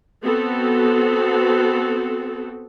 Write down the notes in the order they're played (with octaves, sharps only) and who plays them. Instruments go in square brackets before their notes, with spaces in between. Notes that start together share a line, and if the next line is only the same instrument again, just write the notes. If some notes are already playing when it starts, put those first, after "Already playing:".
[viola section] B3 C4 F#4 A4